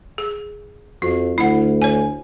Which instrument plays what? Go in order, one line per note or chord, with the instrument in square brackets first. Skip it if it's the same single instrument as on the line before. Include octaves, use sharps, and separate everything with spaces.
[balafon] G#4
[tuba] F2 [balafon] F#4
[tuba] D2 [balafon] E4 F#5
[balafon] C#5 G#5